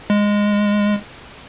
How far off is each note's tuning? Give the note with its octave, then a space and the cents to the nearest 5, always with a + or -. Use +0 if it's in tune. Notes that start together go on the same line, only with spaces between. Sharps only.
G#3 -10